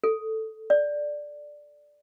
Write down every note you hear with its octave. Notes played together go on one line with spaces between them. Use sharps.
A4
D5